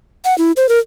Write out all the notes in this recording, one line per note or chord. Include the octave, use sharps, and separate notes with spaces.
F#5
E4
C5
A#4